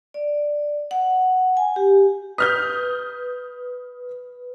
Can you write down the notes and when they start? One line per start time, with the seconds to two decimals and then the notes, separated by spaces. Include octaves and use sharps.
0.14 D5
0.91 F#5
1.57 G#5
1.76 G4
2.38 B4 D#6 F6 G6